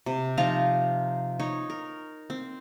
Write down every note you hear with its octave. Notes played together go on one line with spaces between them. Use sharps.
C3
F3 D#4 F4 A#5
D#4 C#5
A#4
C4